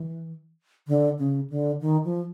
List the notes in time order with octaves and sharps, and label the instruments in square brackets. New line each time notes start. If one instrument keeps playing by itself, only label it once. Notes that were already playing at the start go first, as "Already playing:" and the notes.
Already playing: [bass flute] E3
D3
C#3
D3
D#3
F3